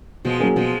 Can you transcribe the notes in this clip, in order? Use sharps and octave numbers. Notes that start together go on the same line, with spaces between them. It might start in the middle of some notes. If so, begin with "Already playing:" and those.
B2 F3 G#3
F#3 A#3 C#4 G#4
B2 F3 G#3